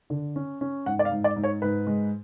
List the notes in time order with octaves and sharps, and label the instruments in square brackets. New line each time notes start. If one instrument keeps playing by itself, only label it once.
[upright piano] D3
C#4
C#4
G#2 F#5
D5
F5
G#2
D5
G#2
C#5
G#2 B4
G#3